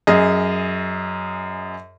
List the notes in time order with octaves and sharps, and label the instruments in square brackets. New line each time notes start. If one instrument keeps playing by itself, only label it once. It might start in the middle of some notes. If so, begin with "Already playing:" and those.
[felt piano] F#2 G#4 D#5